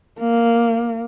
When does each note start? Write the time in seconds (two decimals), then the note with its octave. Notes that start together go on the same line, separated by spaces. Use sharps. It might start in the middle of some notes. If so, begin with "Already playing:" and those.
0.20 A#3